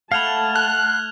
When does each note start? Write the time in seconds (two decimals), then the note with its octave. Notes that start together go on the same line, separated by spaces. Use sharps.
0.12 A3 F5 F#5 A5 B5 F6 G#6 F7
0.55 F#6